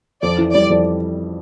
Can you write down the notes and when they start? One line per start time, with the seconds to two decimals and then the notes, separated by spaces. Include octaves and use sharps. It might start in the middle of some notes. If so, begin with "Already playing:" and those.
0.23 F2 D5
0.38 E3
0.54 G3 D5
0.70 F2